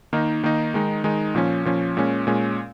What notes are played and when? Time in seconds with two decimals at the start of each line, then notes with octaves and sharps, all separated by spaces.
0.13 D#3 A#3 D#4
0.43 D#3 A#3 D#4
0.74 D#3 G#3 D#4
1.04 D#3 G#3 D#4
1.35 A#2 F3 C#4
1.65 A#2 F3 C#4
1.97 A#2 G#3 C#4
2.27 A#2 G#3 C#4